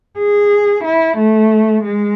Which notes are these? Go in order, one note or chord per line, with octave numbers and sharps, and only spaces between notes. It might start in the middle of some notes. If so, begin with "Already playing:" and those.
G#4
E4
A3
G#3